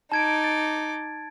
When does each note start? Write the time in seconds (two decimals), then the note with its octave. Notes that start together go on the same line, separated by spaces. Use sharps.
0.12 D#4 A5 D6 G#6 D7
0.44 A6